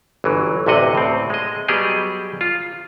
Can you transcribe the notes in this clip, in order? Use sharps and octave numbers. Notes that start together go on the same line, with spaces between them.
G1 E3 F#3
A1 D2 C3 F#4 D#5 F#5
A2 C4
G#3 D#5
F#3 G3 B3 G4 G#4 D#5
F4